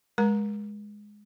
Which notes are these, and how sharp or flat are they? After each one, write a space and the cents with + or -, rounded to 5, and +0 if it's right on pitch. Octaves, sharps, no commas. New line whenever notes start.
G#3 +0 A#4 +40 A#5 +0